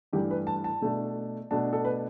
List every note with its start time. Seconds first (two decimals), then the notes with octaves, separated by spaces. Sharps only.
0.13 G2 E3 A3 D4 G4
0.31 B4
0.47 A5
0.64 A5
0.81 B2 A3 D4
1.51 B2 A3 D4 A5
1.73 A4
1.85 B4